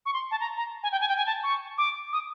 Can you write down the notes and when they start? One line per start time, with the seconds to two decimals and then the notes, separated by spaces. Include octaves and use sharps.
0.06 C#6
0.14 C6
0.31 A5
0.40 A#5
0.57 A#5
0.83 G#5
0.92 G5
1.01 G#5
1.09 G5
1.17 G#5
1.26 A5
1.43 C#6
1.78 D6
2.13 D#6